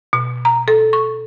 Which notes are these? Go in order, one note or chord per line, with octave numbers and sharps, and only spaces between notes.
B2
A#5
A4
C#6